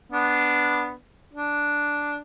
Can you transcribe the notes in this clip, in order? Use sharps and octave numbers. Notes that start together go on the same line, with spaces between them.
B3 D4
D4